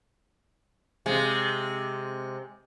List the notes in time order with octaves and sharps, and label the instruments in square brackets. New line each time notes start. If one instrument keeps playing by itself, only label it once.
[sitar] C3 G#3